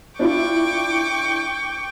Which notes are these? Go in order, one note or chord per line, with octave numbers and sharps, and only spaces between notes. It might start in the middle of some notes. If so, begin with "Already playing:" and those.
D4 E4 F4 G5 C#6 D6